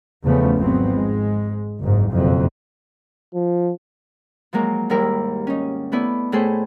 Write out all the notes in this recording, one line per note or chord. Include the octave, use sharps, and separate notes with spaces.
E2 C#3 F3 A3 B3 C#4
G#1 G#2 F3 F#3 B3 C4
G#2 G#3
F#1 G#2
F#1 F2 B2 F#3
F3
F3 F#3 G#3 A#3 A#4
D#2 G#2 G3 E4 A#4 E6
C#4 D#4
A3 B3 E4 D5
A2 A3 G#4 A4 C5